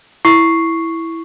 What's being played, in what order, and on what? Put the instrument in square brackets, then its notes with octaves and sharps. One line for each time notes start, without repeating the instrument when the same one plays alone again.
[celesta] E4 C#6 C7